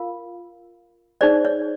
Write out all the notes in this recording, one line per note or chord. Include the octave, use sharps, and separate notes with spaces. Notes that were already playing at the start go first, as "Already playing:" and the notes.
Already playing: F4 A#4 F5
D#4 G#4 C5 D5
C#5